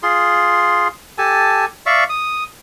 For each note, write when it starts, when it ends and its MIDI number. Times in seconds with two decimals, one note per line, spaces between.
0.03 0.88 65
0.03 0.88 68
0.03 0.88 84
1.18 1.65 67
1.18 1.65 69
1.18 1.65 80
1.18 1.65 81
1.86 2.04 74
1.86 2.04 76
1.86 2.04 77
1.86 2.04 85
2.09 2.44 87